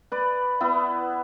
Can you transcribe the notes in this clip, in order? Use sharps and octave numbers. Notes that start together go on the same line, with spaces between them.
B4 D5
B3 E4